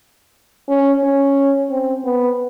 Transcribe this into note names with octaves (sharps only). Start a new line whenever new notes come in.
C#4
C#4
C4
B3